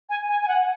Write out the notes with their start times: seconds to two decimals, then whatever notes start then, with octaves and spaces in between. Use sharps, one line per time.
0.09 G#5
0.29 G#5
0.42 G#5
0.48 F#5